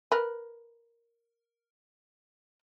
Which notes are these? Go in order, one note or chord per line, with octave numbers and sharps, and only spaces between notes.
A#4 B4